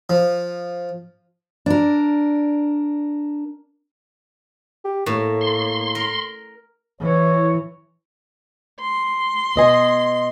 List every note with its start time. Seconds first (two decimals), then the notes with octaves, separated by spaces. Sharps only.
0.10 F3
1.66 D4 A#4
4.85 G4
5.06 A2 A#3
5.41 C6
5.95 A#4
7.01 E3 C#5
8.81 C6
9.56 B2 D#5 G#5